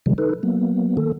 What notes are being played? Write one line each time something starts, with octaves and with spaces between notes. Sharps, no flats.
C3 D#3 F3 G3 G#3
D#4 A4 B4
F#3 A#3 B3
D#3 A#3 A4